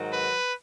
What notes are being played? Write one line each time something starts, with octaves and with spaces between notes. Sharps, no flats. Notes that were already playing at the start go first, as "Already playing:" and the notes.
Already playing: G#2 D#3 F#3
B4